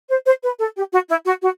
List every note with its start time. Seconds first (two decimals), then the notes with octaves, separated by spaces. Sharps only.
0.09 C5
0.26 C5
0.42 B4
0.59 A4
0.75 G4
0.92 F#4
1.08 E4
1.25 F#4
1.42 F#4